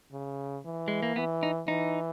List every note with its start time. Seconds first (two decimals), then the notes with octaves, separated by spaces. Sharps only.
0.12 C#3
0.65 E3
0.88 G#3
1.03 A#3
1.16 E3 B3
1.43 D#4
1.68 E3 D#4